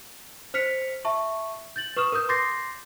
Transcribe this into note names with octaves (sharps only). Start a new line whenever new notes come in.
C5 F6 B6 C#7 F7
E5 A5 C#6
G6 A6 F#7
B4 C#6 D#6 F6 E7
A#4 B4 D#6 G6
C6 D6 G6 A6 A#6 C7